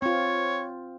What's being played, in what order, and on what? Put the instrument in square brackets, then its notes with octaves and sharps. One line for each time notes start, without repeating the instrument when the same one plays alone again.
[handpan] C4 F4 [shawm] C#5